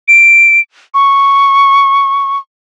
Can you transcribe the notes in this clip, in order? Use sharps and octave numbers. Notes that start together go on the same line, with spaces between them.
D7
C#6